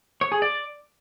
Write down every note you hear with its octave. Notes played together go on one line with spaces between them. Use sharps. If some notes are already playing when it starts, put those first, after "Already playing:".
C#5
G#4
D5